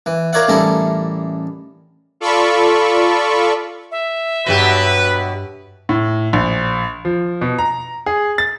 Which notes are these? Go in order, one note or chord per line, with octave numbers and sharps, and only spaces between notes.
E3
F4 A#4 C#5 D5 E5 F#5
A1 G3 D#4 E4 A4 A#4
F4 A4 D5 B5 C#6
E5
G2 B2 F#3 G4 B4 A#6
A2
A#1
F3
B2
A#5
G#4
A6